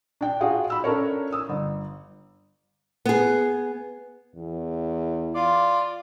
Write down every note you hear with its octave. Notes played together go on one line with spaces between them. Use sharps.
D4 G5
F4 F#4 G#4 F5 G5
B5 E6
C#4 D4 A4 A#4 C#5
D#6 E6
G1
B3 G#4
E2
F4 D5